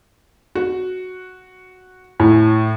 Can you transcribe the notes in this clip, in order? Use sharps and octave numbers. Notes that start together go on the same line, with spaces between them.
F#4
A2